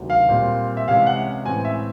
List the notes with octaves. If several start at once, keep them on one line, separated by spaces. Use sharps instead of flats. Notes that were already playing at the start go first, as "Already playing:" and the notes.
Already playing: D2 C3 D#3 F#3
F5
A#2 G3 C4
E5
C3 E3 G#3 C#4 F5
F#5
A2 E3 G#3 C4 G#5
E5